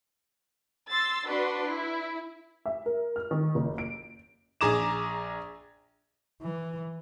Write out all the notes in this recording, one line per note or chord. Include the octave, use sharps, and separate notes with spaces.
C6 E6 A6
D4 F#4 B4 C6
E4
E5
A#4
F6
D#3
F#1
D7
A#1 G#4 A#5 D6 E7
E3